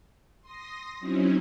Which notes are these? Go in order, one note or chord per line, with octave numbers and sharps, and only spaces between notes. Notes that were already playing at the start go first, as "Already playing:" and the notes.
C6 D#6 A#6
F#3 C4 C#4 D#4 E4